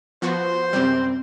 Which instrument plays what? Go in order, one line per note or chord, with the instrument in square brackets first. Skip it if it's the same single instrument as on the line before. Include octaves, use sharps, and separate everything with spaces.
[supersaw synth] F3 B3 F#4 [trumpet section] C5
[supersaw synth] F#2 C3 G3 [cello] C4